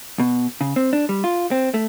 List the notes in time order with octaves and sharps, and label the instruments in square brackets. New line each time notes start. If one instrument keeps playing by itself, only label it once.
[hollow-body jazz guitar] B2
C#3
C4
D4
G3
F4
C4
A3